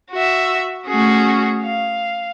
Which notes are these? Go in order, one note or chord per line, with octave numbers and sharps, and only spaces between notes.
F#4 E5
A3 C#4 F#4 G#4
F5